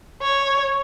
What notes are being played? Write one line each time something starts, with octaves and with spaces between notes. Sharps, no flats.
C#5